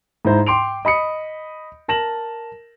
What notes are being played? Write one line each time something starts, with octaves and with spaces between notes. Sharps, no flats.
G#2 E4 C5 A#5
G5 C6 D6 D7 F7
D#5 B5 D#6 C#7
A#4 A5 A#6 E7 F#7